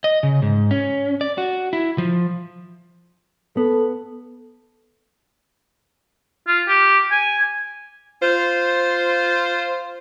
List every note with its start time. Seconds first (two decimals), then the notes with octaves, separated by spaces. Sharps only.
0.04 D#5
0.23 C#3
0.42 G#2
0.71 C#4
1.21 D5
1.38 F#4
1.73 E4
1.98 F3
3.57 B3 A4
6.47 F4
6.68 G4
7.11 G#5
8.21 F4 C5